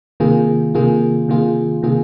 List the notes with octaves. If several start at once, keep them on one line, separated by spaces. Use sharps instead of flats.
C3 D#3 A#3 F4 G#4
C3 D#3 A#3 F4 G#4
C3 D#3 A#3 F4 G#4
C3 D#3 A#3 F4 G#4